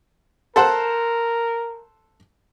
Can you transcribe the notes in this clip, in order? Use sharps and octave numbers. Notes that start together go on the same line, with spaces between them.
A4 A#4 C5 F#5